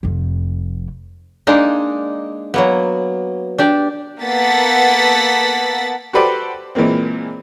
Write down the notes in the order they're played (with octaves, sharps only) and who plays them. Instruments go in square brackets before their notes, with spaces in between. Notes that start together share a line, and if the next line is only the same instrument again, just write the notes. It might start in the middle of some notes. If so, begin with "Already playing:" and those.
[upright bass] F1 F2
[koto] G#3 A#3 D4 D#4
F#3 A#3 B3
D4 G4 D5
[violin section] A#3 B3 A4 F#5 A6 B6
[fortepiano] F#4 G4 A4 B4 C5 D5
A#2 E3 G#3 A#3 C4